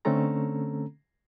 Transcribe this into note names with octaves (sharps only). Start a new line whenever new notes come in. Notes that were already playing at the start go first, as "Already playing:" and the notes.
D3 A3 C4 C#4 A4 A#5